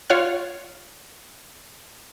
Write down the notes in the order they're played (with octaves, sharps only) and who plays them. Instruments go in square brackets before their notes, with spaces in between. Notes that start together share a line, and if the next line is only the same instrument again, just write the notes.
[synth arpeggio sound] F4 C#5 F#5 F6